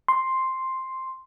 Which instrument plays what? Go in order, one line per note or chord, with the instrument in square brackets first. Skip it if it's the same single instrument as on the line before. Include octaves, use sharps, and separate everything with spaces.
[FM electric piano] C6